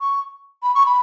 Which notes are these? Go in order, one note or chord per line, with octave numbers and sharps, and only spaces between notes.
C#6
B5
C#6
B5